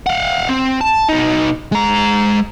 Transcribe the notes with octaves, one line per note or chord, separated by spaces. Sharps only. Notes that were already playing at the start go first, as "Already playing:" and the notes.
F5 F#5
C4
A5
B2 D#4
G#3 A#5